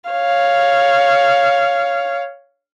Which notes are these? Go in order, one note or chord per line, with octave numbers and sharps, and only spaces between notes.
C#5 F5